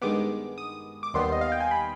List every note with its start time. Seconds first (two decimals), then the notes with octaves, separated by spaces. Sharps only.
0.02 G2 D#3 G#3 B3 D6
0.58 D#6
1.03 D6
1.14 D#2 D#3 G3 B3 C6
1.32 D#5
1.41 F5
1.52 G5
1.60 G#5
1.71 B5